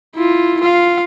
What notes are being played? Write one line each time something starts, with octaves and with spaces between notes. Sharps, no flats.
E4 F4
F4 F5